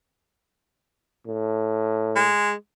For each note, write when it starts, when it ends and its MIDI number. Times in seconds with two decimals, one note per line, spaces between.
1.27 2.32 45
2.15 2.52 56